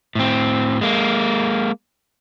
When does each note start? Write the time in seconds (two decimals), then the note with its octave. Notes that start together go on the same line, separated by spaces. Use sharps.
0.15 A2 C4
0.81 G#3 A#3